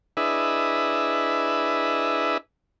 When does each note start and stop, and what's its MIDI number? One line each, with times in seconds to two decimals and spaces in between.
0.17 2.38 62
0.17 2.38 64
0.17 2.38 68
0.17 2.38 71
0.17 2.38 75
0.17 2.38 76